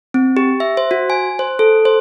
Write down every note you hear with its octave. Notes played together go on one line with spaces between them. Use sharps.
C4
G4
E5
C5
F#4
G#5
C5
A4
C5